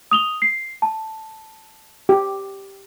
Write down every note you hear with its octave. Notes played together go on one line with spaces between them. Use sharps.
D#6 F7 G7
C7
A5
G4